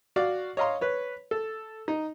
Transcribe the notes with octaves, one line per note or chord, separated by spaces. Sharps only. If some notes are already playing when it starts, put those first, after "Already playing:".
F#4 D5 F5
C#5 D#5 F5 A#5 C6
B4 C#5
A4
D#4